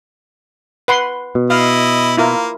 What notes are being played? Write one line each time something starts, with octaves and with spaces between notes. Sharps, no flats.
B4 F#5 C6
B2
E4 D#5 F5
A#3 E4 F4 A#4